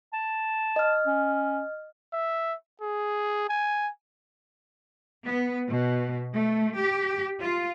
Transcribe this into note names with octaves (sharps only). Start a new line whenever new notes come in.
A5
D#5 F6
C#4
E5
G#4
G#5
B3
B2
A3
G4
F4